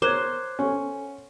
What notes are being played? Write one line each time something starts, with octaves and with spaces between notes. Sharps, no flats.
A#4 C5 C#5 D6 F#6 G#6
C#4 A4 F#5 G#5